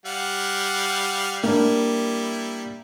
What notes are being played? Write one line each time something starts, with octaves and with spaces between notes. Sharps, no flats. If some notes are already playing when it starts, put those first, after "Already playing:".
G3 F5 F#5
G3 A#3 D4 E4